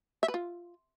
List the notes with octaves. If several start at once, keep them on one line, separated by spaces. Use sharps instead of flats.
E5
B4
F4